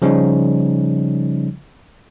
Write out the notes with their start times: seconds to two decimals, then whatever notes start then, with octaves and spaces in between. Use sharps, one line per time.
0.02 C#3 F3 G3 C#4 D#4